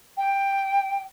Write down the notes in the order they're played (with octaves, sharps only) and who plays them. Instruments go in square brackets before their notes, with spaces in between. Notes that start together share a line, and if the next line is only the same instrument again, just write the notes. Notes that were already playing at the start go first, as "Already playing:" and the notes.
[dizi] G5